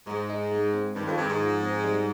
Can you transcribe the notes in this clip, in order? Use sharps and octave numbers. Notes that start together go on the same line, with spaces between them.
G#2 G#3
D#4
G#3
C4
G2 D#3
F2
G2 G#3
G#2
F3
C4
G3